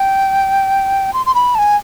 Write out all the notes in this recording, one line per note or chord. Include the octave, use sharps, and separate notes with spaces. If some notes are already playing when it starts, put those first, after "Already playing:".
Already playing: G5
C6
C6
B5
A5
G#5